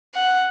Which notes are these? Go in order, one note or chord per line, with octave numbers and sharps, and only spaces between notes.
F#5